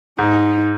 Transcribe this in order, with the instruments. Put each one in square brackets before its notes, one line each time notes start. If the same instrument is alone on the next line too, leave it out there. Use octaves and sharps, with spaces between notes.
[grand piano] G#2 [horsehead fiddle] D#4